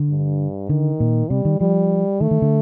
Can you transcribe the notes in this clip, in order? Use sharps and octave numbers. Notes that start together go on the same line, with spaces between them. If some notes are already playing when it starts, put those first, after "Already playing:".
Already playing: D3
G2
D3 D#3
A#2
C3 G3
D#3
F3 G3
D#3 A3
D#3
D3